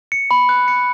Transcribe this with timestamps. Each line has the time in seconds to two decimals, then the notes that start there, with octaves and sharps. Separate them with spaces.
0.12 C#7
0.31 B5
0.49 F#6
0.68 C#7